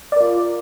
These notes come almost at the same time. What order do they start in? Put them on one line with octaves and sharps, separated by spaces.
D5 A#4 F4